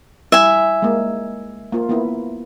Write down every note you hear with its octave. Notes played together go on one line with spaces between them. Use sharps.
G3 E4 E5 G#5
G#3 A#3
A#3 F4
A#3 B3 E4